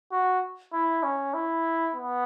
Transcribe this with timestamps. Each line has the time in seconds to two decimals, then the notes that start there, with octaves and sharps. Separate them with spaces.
0.12 F#4
0.73 E4
1.03 C#4
1.34 E4
1.95 B3